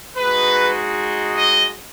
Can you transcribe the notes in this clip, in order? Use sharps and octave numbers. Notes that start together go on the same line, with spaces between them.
G#3 D#4 F#4 B4
D#5